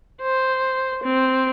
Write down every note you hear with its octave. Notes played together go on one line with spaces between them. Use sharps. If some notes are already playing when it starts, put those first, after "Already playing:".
C5
C4